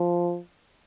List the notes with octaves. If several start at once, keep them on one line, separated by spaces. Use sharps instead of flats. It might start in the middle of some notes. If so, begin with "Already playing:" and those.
Already playing: F3